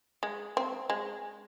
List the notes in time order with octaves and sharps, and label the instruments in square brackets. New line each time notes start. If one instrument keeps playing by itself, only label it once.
[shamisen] G#3
C4
G#3